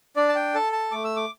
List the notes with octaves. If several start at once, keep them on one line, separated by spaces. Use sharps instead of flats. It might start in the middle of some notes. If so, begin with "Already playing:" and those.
D4 D5
A5
G5
A4 A5
A5
A3 D6
E6
D6